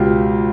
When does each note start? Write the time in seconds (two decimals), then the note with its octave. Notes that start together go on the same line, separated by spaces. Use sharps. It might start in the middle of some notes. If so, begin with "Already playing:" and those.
Already playing: C#2 B2 F4 G4